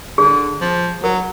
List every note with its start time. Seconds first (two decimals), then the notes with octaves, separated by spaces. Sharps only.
0.18 D3 G#4
0.61 F3
1.03 F#3 A#4